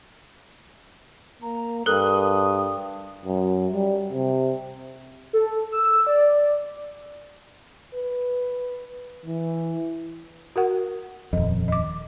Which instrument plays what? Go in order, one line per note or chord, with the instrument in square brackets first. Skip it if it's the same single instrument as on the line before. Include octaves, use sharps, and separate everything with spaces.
[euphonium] A#3 [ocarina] A#5
[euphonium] G2 [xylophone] A4 A#4 F#6 [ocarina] D#6
[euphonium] F#2
G3
C3
[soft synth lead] A4
E6
D5
[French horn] B4
E3
[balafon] F#4 A#4 F#5
[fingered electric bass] D#1 F2 [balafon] D#5
[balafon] D#5 D6